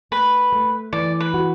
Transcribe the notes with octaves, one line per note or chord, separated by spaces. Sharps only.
A3 B4
A3
E3 D5
B4
F#4